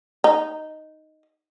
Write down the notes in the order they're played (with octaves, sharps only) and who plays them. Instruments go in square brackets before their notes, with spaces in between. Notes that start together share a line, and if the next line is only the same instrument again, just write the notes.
[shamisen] D#4